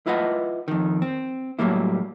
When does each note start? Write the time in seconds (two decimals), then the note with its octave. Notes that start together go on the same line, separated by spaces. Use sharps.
0.06 E4 F4 B4 D#5 F#5
0.68 F2 D#3
1.02 C4
1.59 A2 F#3 G3 A#3 E4